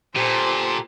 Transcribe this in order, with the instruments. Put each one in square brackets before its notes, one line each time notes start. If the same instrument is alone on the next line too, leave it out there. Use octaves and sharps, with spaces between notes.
[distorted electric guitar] A#2 [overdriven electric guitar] G4 A4 [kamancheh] C5